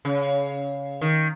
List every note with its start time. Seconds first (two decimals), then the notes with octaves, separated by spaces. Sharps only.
0.05 C#3
1.01 D#3